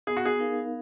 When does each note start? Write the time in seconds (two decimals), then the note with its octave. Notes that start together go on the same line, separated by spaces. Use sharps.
0.07 B3 G#4
0.17 F#4
0.26 G#4
0.40 D#4 A#4 F5